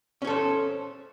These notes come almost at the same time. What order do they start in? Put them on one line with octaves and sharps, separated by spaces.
C#4 C#5 A4 C5